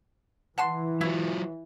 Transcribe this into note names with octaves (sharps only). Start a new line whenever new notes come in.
E3 F#5 A5 C6
F#3 E4 F4